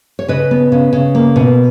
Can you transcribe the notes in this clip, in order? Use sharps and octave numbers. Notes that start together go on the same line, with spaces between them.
C#5
C#3 B4 D#5
B3
C#3
C#3
A#3
B2